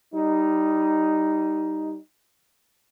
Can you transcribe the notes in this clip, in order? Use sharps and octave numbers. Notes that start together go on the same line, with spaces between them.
G3 D#4